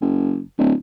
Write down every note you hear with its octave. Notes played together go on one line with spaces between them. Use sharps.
F#1
D1